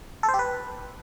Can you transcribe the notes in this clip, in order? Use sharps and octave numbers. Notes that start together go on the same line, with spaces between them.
A4
C5
G4
B4